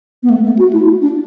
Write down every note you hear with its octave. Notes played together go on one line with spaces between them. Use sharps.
B3
A3
A3
F#4
E4
D4